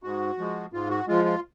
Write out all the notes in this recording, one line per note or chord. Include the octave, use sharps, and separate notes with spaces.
G#2 F#4
F3 G#3
G#2 F4
F#4
F3 G#3 F4
F4